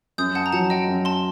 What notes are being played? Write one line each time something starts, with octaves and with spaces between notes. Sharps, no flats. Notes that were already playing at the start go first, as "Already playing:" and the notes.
F#2 D#6 G6
F#5 A5
A#5
F#3 F#5 A5
D#5 G5
F#2
A5 C6